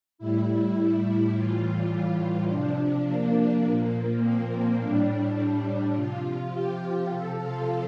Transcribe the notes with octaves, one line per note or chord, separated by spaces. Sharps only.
A2 G3 E4
A2 E3 G3 F4
C3 F3 D4
A#3
A#2 F3
C4
A2 G3 D4
C3 F3 F4
G4
C3 F3 A4
F4